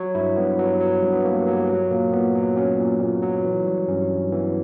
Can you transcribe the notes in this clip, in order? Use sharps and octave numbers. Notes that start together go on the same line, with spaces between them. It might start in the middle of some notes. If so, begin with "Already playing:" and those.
Already playing: F#3 C#5
G2 E4
G2 B3
F#3
F#3
G2
B3
G2 A#3
F#3
F#3
A#2 A#3
A#2 B3
F#3
F#3 C#4
A#2
A#2
F#3
E3
G3
G2 C#4
G2
E3 B3